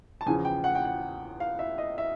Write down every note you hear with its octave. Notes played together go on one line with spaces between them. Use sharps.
A5
E2 C#3 F3 G#5
G5
F#5
G5
F#5
F5
E5
D#5
E5